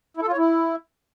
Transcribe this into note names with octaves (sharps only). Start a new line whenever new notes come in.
E4
A4
F4
C#5
E4